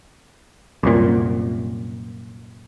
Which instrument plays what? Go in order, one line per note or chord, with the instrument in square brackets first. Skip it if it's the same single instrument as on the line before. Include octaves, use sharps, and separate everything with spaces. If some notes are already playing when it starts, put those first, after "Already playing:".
[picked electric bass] C2 F#2 A#2